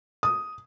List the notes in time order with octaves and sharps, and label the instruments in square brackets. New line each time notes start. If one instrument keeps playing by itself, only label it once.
[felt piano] D#6